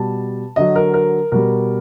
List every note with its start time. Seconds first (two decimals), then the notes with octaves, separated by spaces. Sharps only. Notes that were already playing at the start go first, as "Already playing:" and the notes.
Already playing: B2 G3 A5
0.56 D3 F#3 D#5
0.76 A#4
0.94 A#4
1.32 B2 G3 A#4